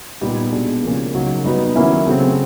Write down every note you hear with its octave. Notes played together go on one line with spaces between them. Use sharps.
A#2 G3 B3 D#4 G4
B2 G#3 B3 D4 F#4
C#3 F3 A#3 C#4
C#3 F#3 A#3 D#4
G3 B3 D#4 F#4 B4
D#3 F#3 A#3 C#4 E4
C#3 F#3 A3 C4